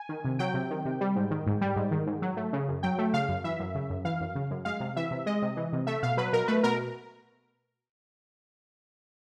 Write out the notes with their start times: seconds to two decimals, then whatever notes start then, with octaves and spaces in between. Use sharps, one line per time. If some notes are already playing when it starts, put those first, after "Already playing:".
Already playing: G#5
0.09 D#3
0.24 C3
0.39 F#3 G5
0.54 C3
0.70 D#3
0.85 C3
1.01 G3
1.16 G#2
1.31 D#3
1.47 G#2
1.61 G3
1.76 G#2
1.91 D#3
2.07 G#2
2.22 F#3
2.37 A3
2.53 C#3
2.68 F#2
2.83 F#3 G5
2.98 A3
3.14 C#3 F5
3.28 F#2
3.44 E3 E5
3.59 F#2
3.75 C#3
3.90 F#2
4.05 E3 F5
4.21 F#2
4.35 C#3
4.51 F#2
4.65 G#3 F5
4.80 C3
4.96 E3 E5
5.11 C3
5.26 G#3 D#5
5.42 C3
5.57 E3
5.73 C3
5.87 A3 E5
6.03 B2 F5
6.17 F#3 B4
6.32 B2 A#4
6.48 A3 B4
6.63 B2 A#4